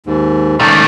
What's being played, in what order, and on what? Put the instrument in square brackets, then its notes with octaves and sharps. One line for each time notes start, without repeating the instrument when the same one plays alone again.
[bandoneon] D#2 G#2
[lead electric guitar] D#3 A3 [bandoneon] C#4 D#4 D5